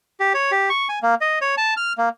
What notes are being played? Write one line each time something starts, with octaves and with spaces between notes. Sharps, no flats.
G4
C#5
G4
C#6
G#5
A#3
D#5
C#5
A5
F6
A#3